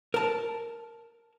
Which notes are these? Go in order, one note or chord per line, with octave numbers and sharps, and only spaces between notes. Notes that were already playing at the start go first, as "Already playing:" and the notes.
A#4 A5